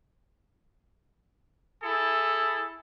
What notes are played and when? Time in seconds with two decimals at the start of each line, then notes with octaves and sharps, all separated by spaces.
1.83 E4 G#4 A4